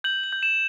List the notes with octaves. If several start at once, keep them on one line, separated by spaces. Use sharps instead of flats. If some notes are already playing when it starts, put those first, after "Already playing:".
G6 F#7
F#7
G6
E7